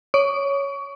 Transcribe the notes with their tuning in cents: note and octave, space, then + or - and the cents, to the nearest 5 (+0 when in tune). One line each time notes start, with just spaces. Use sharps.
C#5 +5 C#6 +25